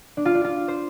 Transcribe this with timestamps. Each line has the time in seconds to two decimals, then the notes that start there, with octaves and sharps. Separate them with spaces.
0.17 D4
0.25 F4
0.35 D4
0.44 F4
0.68 C5